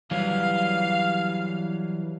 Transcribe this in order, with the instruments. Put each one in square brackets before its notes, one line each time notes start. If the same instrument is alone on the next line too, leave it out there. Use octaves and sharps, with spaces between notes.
[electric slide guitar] E3 F#3 G3 [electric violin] F5